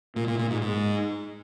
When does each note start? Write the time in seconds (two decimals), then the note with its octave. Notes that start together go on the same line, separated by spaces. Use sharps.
0.16 A#2
0.27 A#2
0.39 A#2
0.50 G#2
0.61 G#2